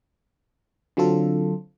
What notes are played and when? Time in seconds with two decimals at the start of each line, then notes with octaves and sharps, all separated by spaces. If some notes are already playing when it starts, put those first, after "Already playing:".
0.97 D3 F#3 C4 F4 A4